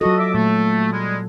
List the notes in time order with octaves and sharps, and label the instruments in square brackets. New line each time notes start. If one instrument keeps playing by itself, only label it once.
[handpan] F#3 F4 A4 [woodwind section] F#4 D#5
[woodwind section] D#5 E5 D6
[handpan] A#2 [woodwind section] A3
[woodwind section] G3 G#3